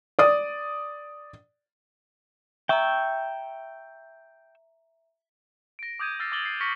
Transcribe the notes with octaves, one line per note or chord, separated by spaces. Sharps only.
D5 D#6
E5 G5 A#5 C#6 E6
A#6 D7
D6 D#6 G6 G#6 D#7
E6 F6 A6 C7
D6 A6 F#7 G7
C7
C#6 F6 A#6 B6 C#7